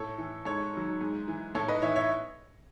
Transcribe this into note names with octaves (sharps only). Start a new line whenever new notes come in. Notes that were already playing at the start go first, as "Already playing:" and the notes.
Already playing: A2 A4 C#5
E3
G#2 A4 C#5
D#3 F#3
G#2
E3
A2 A4 C#5
B4 D#5
E3 C#5 E5
C#5 E5